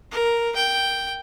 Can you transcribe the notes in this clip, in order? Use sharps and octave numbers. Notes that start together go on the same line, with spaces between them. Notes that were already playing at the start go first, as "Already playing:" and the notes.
A#4
G5